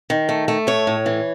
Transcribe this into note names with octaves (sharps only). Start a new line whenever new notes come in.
D#3
A3
A3
A2 C#5
A2
E3